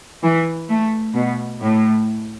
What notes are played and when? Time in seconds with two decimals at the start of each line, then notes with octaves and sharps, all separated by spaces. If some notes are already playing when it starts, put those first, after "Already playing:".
0.23 E3
0.69 A3
1.14 B2
1.60 A2